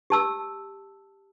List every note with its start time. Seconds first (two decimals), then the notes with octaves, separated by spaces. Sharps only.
0.10 G4 A5 E6